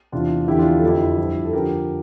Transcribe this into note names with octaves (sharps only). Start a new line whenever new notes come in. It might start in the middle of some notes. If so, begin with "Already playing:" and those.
E2 C3 E3 D4 F4
E2 D3 F3 E4 G4
D4 F4
G4
A4
F2 D3 F3 E4 G4
F3
G2
A4
F2 D3 F3 G4 A#4